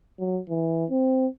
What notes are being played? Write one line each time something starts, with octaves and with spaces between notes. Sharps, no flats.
F#3
E3
C4